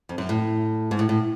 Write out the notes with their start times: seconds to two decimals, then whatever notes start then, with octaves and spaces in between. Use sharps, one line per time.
0.09 F2
0.18 F#2
0.29 A2
0.91 G#2
0.99 A2
1.09 A2